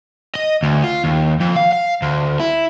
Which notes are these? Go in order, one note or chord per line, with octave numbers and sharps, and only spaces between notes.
D#5
D2
F4
D#2
F2
F5
F5
D2
E4